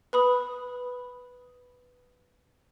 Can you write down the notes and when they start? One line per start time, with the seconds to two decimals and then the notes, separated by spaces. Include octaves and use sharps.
0.13 B4 B5 D#6